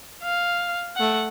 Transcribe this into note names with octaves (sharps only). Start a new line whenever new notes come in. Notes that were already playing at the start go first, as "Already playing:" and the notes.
F5
A3 F#5